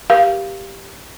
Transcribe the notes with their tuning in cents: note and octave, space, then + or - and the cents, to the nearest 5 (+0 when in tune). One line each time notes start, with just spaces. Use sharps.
G4 +0 A#4 +35 F5 -10